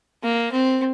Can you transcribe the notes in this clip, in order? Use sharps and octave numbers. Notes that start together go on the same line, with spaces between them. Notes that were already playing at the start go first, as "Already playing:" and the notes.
A#3
C4